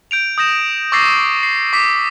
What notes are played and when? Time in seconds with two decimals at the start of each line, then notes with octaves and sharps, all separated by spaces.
0.11 G6 D7 F7
0.38 D#6 G6 A#6 E7
0.92 C#6 D6 E6 A6 A#6 C7
1.43 C7
1.73 D6 B6